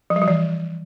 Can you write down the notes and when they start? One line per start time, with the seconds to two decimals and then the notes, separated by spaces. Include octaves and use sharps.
0.10 F3
0.16 G3
0.22 F3
0.28 E3